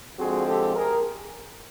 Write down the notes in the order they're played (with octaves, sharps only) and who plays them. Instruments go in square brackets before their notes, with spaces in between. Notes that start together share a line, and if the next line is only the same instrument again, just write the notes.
[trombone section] D3 F3 G#3 C4 F#4 G#4
G4 A4
G#4 A#4